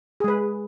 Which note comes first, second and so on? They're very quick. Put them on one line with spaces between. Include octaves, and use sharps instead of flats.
G#4 G#3 B4